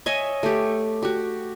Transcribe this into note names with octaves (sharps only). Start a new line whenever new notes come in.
C#5 D#5 E5 G#5
A3 G4
F#4 G4